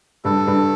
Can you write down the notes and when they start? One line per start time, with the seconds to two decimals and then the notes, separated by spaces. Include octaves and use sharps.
0.25 G2 A4
0.47 G2